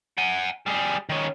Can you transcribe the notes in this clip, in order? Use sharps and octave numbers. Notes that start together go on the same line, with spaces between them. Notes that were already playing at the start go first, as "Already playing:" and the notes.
F#5 G#5
G3 G#4
D#3 C#4